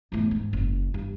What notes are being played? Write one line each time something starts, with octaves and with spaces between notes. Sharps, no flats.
E2 A2
G#2
F#1
G2